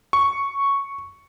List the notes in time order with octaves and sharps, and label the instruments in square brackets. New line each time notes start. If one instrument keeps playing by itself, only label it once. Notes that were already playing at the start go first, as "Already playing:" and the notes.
[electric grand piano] C#6